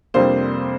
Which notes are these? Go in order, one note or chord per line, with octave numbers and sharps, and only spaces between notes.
F2 C3 G3 A#3 D4 C5